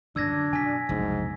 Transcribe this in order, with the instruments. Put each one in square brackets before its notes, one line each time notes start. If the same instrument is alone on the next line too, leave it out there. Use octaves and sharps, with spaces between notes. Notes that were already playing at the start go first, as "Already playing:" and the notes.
[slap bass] F#2 D3 [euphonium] D4 [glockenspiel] E6 G#6 A#6
[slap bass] B2 [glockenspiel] G#5 B6
[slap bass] F1 B1 [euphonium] G#2